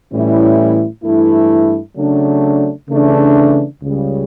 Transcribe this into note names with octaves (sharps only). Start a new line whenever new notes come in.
A2 E3 G3 C#4 E4
G2 E3 A3 E4
C#3 F#3 A3 D4
C#3 E3 A3 D4
C#2 C#3 G3